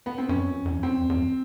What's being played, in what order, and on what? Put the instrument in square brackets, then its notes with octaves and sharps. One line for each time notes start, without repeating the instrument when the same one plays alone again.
[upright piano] B3
C4
[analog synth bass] F#2 [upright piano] C#4
[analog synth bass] F2
F2
F#2
[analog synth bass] F2 [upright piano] C4
[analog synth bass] E2
E2
F#2